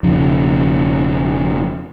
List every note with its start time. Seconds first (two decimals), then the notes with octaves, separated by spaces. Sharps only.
0.03 E1 C#3 F3